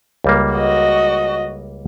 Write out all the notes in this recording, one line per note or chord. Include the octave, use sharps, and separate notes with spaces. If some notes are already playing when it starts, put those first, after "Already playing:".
C#2 G3 A#3
F#4 D#5